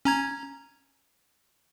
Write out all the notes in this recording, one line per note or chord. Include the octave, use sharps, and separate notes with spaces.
C#4 A#5 G#6